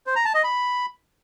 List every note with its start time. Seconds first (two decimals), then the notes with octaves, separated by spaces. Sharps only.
0.07 C5
0.16 A#5
0.25 A5
0.34 D#5
0.44 B5